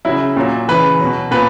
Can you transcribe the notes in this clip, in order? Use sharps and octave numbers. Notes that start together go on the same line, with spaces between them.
C#3 F#3 E4
A#2 F#3
C#3 E3 B4
B2 F#3
A#2 B4